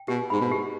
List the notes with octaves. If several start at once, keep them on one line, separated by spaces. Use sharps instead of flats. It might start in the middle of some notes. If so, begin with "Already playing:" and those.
Already playing: G5
B2 G4
G#2 B5
B2
G4